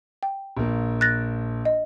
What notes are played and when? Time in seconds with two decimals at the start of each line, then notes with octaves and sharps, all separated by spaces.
0.23 G5
0.57 A#1 A#3
1.01 F#6 A6 A#6
1.65 D#5